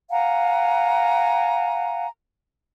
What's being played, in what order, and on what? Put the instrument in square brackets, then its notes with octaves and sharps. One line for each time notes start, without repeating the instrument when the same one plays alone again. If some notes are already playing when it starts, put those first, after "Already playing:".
[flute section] F5 F#5 G#5 A#5